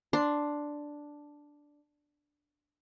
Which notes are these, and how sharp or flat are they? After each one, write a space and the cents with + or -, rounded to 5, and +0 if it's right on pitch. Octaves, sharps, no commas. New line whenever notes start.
D4 +0 C6 +0